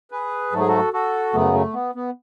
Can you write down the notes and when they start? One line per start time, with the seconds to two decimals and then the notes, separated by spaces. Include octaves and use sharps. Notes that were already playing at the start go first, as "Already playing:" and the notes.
0.11 G#4 B4
0.51 G#2 F#3 A3 A4
0.60 G#4
0.67 F#4 A4
0.93 F#4 A4
1.33 F#2 C#3 F#3 A3 B3
1.53 A3
1.74 B3
1.95 B3